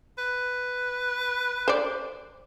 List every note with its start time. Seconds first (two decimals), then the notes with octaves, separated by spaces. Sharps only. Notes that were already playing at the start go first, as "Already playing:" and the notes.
0.18 B4
1.68 C5 D5